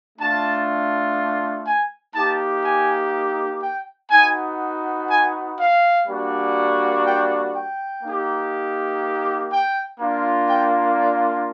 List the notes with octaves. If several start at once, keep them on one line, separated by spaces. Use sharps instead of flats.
A3 D4 F4 A5
G#5
A#3 D#4 G4 A5
G#5
G5
B3 D#4 F#4 G#5
G#5
F5
G3 A#3 D4 F#4
G5
G5
A#3 D#4 G4
G5
A#3 D4 F4
G5
D5